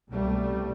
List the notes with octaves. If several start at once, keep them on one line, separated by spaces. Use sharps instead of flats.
C2 B2 G3 A3